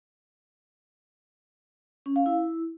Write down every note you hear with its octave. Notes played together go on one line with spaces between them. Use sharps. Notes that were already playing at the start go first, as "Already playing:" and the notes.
C#4
F5
E4